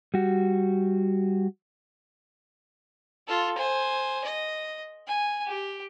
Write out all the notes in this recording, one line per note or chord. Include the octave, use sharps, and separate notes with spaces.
G3 F#4
F4 A4
C5 G#5
D#5
G#5
G4